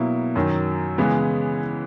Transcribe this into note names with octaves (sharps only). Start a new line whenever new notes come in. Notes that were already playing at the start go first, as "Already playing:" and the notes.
Already playing: B2 F#3 A#3 E4
F#2 D#3 F#3
C#3 E3 G#3 B3